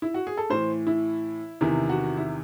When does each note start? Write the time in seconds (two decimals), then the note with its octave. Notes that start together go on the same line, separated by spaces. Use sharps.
0.02 E4
0.14 F#4
0.27 G#4
0.37 A4
0.50 A2 E3 C5
0.87 E4
1.61 E2 C3 D#3 E4
1.89 F#4
2.17 E4